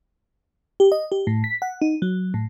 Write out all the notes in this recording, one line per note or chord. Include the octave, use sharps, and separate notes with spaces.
G4
D#5
G4
A2
B6
F#5
D#4
F#3
A2